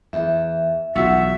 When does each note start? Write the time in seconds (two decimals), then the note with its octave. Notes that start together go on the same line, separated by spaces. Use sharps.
0.13 E2 E5
0.96 B1 E2 F4 F#4 E5